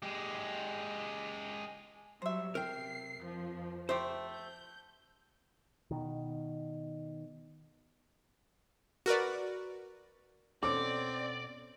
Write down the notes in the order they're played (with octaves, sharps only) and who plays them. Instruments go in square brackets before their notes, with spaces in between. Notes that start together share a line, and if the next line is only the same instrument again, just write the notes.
[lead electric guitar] G#3 G4
[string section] F#3 G3 [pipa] C5 E5
[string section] C3 C7 [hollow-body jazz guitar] A#4 G5
[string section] F2 F3
[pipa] A3 G4 [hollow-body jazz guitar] C5
[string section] G6
[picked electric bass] B2 D#3
[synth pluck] F#4 A#4 B4 D5
[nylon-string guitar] B2 C#4 A4 [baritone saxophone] C4 [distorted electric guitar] D5 [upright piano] D6